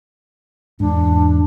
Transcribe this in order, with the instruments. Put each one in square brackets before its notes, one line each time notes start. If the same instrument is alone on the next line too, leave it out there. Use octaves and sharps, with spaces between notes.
[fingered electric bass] E2 G#2 [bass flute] D4